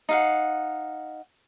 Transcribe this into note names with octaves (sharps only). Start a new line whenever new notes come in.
D#4 F5 F#5